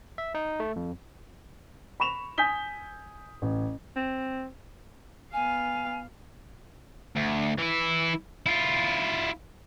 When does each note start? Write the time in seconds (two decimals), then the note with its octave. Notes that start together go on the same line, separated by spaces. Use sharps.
0.18 E5
0.35 D#4
0.60 A3
0.76 F2
2.00 B5 C#6 E7 F7
2.38 G#5 D#6 G6 B6 G7
3.42 A1
3.96 C4
5.33 B3 F5 G#5
7.16 D2
7.58 E3 E4
8.46 E4 F4